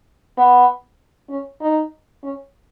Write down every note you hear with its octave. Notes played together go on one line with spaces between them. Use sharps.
B3
C#4
D#4
C#4